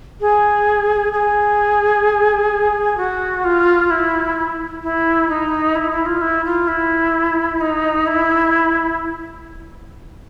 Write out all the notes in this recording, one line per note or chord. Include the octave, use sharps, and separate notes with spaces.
G#4
G#4
F#4
F4
E4
E4
D#4
E4
E4
F4
E4
F4
E4
D#4
E4